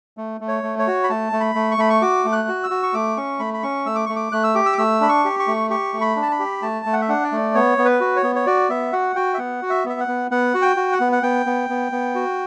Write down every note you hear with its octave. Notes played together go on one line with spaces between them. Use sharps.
A3
A3
C#5
A3
C#5
F#4
B5
A3 A5
A3
B5
A3
C#6
A3 B5
C#6
F#4 D6
A3
F#6
F#4
E6
F#4
C#6
A3 D6
C#4 C#6
A3 B5
B5
C#4 C#6
A3 E6
D6
A3 C#6
D6
A3 F#6
E6
G4 D6
E6
D6
A3 E6
D4 B5
C#6
G4
C#6
A3
G4 C#6
A3
B5
D4
A5
B5
G4
A3 A5
A3
F#5
E5
D4 F#5
D5
A3
B3 C#5
B3
B4
F#4
C#5
B3
C#5
F#4 D5
B3 E5
F#4 F#5
F#4 G5
E5
B3 F#5
F#4
E5
B3 E5
F#5
B3
B3 F#5
F#4
G5
F#4
F#5
B3
F#5
B3 G5
B3
B3
B3
F#4